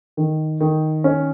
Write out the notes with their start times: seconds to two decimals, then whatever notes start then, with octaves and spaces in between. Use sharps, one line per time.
0.17 D#3
0.60 D#3
1.04 C#4